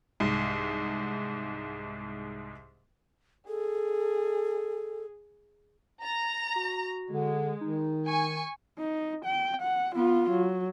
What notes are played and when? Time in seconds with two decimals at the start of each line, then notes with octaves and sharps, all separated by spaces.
0.20 C2 G#2
3.48 G#4 A4
6.02 A#5 A6
6.56 F#4
7.11 D3 G#3
7.61 D#3 D#4
8.07 G#5 C#6
8.78 D#4
9.25 G5
9.62 F#5
9.96 B3 F4
10.31 F#3